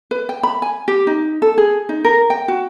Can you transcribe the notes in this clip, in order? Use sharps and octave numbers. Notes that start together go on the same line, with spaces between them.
B4
G5
B5
G#5
G4
D#4
A4
G#4
D#4
A#4
G5
F#4